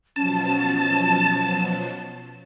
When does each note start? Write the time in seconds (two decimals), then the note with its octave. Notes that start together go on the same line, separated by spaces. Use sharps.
0.16 B2 F3 F#3 C#4 A5